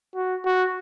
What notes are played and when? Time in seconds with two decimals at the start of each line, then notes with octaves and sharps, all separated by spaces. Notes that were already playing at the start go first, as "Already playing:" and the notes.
0.15 F#4
0.45 F#4